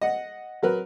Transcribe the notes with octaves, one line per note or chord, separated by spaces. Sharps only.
D#5 F#5
F#3 A#4 B4